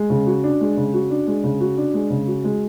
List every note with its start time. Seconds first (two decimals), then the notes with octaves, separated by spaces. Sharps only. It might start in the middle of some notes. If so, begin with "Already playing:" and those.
Already playing: G#3
0.10 C#3
0.27 F#4
0.44 D4
0.61 G#3
0.77 C#3
0.94 F#4
1.11 D4
1.27 G#3
1.44 C#3
1.60 F#4
1.77 D4
1.94 G#3
2.10 C#3
2.27 F#4
2.44 G#3